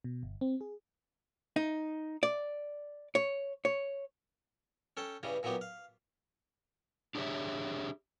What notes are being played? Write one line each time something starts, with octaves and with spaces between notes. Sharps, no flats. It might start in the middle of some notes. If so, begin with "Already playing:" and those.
B2
G1
C4
G#4
D#4
D5
C#5
C#5
C#4 A4 G5 A5
G2 C#3 E3 G3
A#2 E3 F#3 B3 G4
F5
D4 G4 G#4 C#5 E5